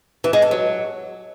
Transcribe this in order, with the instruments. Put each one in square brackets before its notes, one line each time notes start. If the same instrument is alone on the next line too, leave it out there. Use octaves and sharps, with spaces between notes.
[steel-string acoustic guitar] E3
G#3
A4
F#3